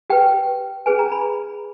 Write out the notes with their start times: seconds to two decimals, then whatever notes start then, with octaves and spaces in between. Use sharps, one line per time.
0.10 G4 B4 G5
0.86 C#4 G#4 B4 G#5
0.99 A#5
1.12 B5